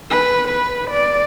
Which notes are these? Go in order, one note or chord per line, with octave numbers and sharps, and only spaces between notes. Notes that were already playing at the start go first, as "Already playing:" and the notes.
B4
B4
D5